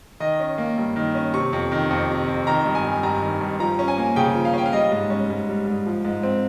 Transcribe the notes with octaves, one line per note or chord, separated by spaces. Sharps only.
D#3 D#5
C#4
A#3
G2
D#3
C#4
C3 C#6
F2
D#3
F2
C3
F2
D#3 A#5
G2
G#5
G3
G2 A#5
D#3
G2
F3 A#5
C#4
G#5
A#3
C#3 G5
F3
F5
C#4 G5
F5
G3 D#5
G#2
C#4
G#2
G3
G#2
F3
G#2
C4